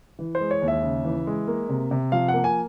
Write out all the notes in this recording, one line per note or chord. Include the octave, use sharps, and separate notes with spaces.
E3
C5
G#3
C#5
D#2
E5
C#3
E3
G#3
A#3
C3
C3
F3 F5
F#5
A#3
G#5